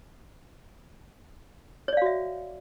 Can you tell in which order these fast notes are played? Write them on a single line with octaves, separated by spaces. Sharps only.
C#5 D5 F5 F#4 E5